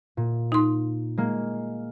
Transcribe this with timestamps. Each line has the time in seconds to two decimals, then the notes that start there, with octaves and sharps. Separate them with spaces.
0.17 A#2
0.52 D#4 C6
1.17 G#3 A#3